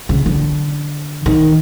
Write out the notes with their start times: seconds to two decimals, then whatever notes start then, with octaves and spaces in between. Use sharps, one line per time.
0.09 C#3
0.26 D3
1.26 D#3